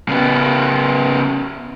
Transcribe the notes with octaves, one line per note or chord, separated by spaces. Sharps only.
C#3 B3